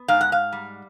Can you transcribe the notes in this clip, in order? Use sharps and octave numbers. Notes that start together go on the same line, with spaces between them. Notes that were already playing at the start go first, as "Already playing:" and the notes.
Already playing: B3
G#2 F5
F#5
F5
G3